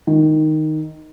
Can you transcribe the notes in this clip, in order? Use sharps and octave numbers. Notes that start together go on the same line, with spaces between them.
D#3